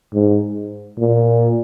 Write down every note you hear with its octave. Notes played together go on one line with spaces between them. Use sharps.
G#2
A#2